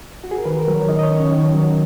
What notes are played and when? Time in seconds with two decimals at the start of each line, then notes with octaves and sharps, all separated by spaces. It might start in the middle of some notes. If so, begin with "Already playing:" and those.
0.24 F#4
0.31 G#4
0.38 A#4
0.45 D#3 B4
0.59 A#4
0.68 F#3
0.74 C#5
0.89 D#3 D#5
0.99 D#5
1.03 C#5
1.10 C#4
1.17 C#5
1.31 D#3 C#5
1.53 F#3